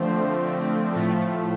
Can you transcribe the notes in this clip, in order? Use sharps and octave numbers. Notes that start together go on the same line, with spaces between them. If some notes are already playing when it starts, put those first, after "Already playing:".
Already playing: D3 F3 A3 C4
A2 F3 A3